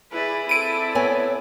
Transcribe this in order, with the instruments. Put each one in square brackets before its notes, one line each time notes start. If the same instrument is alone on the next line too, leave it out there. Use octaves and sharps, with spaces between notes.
[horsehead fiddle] E4 D5 [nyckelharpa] G#4 B4
[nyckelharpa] C4 A4 [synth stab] D7 D#7
[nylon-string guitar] B3 C#5 G#5